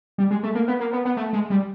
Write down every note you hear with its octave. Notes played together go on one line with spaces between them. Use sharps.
G3
G#3
A3
A#3
B3
A#3
B3
B3
A3
G#3
G3